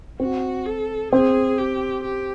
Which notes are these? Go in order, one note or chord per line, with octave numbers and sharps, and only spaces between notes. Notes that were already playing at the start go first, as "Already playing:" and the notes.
C4 F#4
A4
C4 G#4
G4
G4